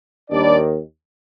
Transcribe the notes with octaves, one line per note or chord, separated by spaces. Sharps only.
D#2 D#3 G3 D4 D5